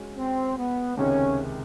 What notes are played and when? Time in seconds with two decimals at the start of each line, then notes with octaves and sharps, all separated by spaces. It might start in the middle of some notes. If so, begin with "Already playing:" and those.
Already playing: G#3 C#4 F#4
0.18 C4
0.57 B3
0.97 C#2 C3 D#3 G#3 C#4